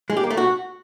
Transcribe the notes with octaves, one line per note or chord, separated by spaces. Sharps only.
G#3
G4
A#3
A3
F#4